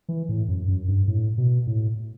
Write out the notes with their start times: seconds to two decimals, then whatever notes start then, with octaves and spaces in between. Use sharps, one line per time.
0.09 E3
0.29 A2
0.48 F#2
0.68 F#2
0.88 G2
1.08 A2
1.38 B2
1.67 A2